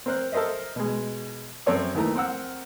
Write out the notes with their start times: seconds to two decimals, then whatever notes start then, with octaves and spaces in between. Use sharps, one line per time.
0.06 C4 A#4 C5 F#6
0.32 A4 A#4 C5 D#5 E5
0.76 B2 G#3
1.66 F#2 C4 A4 C#5 C#6
1.94 D#2 D#3 E3 A3 A#5
2.15 C4 A#4 F#5 E6